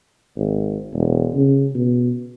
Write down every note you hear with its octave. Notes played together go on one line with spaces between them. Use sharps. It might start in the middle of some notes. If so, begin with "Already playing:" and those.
G#1
E1
C#3
B2